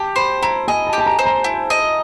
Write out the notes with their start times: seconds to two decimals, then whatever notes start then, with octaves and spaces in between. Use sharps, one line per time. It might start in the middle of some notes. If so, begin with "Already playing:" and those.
Already playing: G4 A5
0.16 C5 B5
0.43 E4 A#5
0.68 D#5 G#5
0.87 A5
0.93 G4
0.98 A5
1.06 A#5
1.19 C5
1.26 A#5
1.44 E4
1.70 D#5